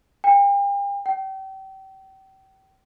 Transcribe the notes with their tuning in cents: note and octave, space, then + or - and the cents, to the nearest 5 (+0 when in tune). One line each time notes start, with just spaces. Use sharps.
G5 +40
G5 -35